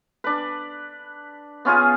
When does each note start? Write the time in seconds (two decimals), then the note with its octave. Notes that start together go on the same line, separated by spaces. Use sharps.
0.24 D4 B4
1.65 B3 C#4 F4 G#4